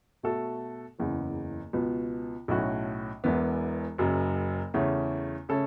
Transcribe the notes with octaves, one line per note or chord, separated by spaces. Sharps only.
B2 A3 F#4 A4
F#1 E2 C#3
C#2 B2 B3
B1 A2 A3 C#4 F#4
E1 E2 E3 B3
F#1 F#2 C#3
E2 C#3 A3 C#4
C#3 A3 C#4 A4